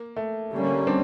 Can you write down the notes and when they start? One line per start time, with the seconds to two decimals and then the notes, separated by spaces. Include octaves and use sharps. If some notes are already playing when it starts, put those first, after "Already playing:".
Already playing: A#3
0.16 A3
0.52 D3 G3 A#3 C#4
0.87 C4 D4